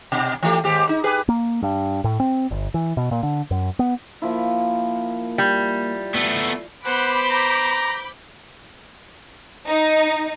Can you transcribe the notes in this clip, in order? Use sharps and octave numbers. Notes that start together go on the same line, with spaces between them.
B2
E3 A3 G4
D#2 G#2 G4
D#4
G4 G#4 B4
A#3
G2
A2
C4
G1
E3
B2
A#2
D3
F#2
B3
F3 A#3 E4
G3
A3 B3 C7
B3 C5 F#5 B5 D6 G6
A#5
D#4